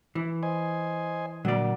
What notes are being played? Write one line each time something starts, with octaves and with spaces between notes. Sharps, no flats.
E3
C5 D#5 G#5
A#2 D3 F#3 D5